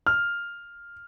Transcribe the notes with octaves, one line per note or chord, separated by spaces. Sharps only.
F6